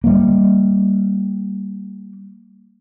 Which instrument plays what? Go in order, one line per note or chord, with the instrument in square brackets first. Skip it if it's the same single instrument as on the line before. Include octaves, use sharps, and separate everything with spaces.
[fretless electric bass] G3 A#3